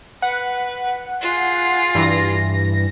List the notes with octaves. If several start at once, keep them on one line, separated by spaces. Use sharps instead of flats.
B4 F#5
F4 G#4
G2 E3 A#6